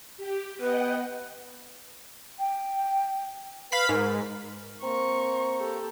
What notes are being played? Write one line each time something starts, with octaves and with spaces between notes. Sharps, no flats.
G4
B3 B4 D#5 F#5 G5
G5
B4 F5 B5 B6
G#2 A#4
A#3 C4 A#5 C#6
G4 A4